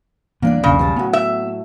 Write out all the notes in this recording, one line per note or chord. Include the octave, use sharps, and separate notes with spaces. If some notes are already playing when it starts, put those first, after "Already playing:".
E3 G3 A#3 B3 D4 D5
E1 B1 E2 C#3
G3 G#4 A5
A2 F#3 B3
E5